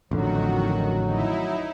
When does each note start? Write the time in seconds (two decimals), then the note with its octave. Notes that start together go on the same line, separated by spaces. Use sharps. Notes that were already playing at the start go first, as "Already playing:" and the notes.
0.11 A1 F2 D3 D#3 F#3 F#4
1.06 D#4 E4